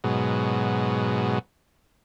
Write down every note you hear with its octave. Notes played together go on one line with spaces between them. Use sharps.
G#2 B2 F#3